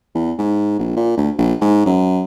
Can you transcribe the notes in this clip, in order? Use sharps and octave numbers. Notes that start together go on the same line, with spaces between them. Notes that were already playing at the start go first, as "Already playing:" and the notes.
E2
G#2
A#1
A#2
D2
A#1
G#2
F#2